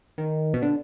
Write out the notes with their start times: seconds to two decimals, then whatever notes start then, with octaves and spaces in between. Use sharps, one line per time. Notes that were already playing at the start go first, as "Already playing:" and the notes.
0.18 D#3
0.54 B2
0.62 D3